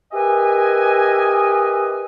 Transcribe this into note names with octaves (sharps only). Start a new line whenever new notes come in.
G4 A#4 B4 D#5 E5 G#5